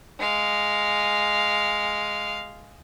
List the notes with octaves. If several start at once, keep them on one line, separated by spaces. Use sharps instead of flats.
G#3 F5